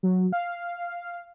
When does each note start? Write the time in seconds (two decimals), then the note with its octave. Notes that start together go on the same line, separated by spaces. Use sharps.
0.03 F#3
0.33 F5